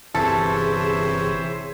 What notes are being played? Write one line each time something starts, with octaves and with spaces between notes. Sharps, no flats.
G1 C3 E3 G#4 A4 C5 C#5 E5